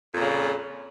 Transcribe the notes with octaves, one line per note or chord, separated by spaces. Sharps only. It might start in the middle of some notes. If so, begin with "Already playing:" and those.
F2 A#2 C#3